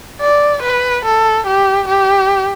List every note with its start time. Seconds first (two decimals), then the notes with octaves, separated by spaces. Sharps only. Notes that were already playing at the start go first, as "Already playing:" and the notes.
0.21 D5
0.63 B4
1.05 A4
1.47 G4
1.88 G4